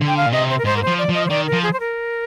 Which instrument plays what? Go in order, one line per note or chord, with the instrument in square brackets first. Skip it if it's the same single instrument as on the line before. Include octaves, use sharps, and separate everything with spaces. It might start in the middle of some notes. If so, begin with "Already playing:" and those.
[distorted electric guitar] D3
[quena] G5
F5
[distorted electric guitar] A#2
[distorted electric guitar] C3 [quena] D#5
[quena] C5
A#4
[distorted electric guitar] G#2 [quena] C5
[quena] A#4
[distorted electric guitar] F3 [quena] C5
[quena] D5
[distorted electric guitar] F3
[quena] D#5
C5
[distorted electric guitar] D#3 [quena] D5
[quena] A#4
[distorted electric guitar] F3
[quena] G#4
C5
A#4